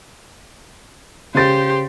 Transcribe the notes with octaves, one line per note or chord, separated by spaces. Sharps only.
C#3 G4 C5 A6